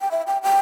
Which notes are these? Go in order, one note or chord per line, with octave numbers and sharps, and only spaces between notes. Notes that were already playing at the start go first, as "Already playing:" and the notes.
G5
E5
G5
G5